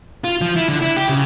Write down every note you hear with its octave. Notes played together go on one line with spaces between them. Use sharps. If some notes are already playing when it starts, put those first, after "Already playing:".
F4
F3
E4
D3
E4
G4
C#3